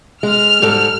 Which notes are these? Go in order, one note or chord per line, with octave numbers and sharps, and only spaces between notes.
G#3 F6
G#2 G3 A4